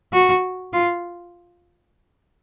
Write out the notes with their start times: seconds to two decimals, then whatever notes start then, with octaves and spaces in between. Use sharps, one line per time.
0.13 F#4
0.73 F4